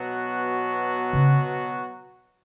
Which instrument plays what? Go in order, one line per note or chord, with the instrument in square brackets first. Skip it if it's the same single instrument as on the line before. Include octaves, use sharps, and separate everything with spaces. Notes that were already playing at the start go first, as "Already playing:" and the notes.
Already playing: [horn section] B2 F#3 B3 F#4
[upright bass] C#3